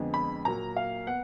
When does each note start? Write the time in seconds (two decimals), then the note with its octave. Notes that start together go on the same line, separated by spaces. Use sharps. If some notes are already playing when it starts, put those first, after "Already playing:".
Already playing: F2 D3 G#3 B3
0.14 B5
0.45 A#2 F#3 A#3 A#5
0.76 F5
1.07 B3 F#5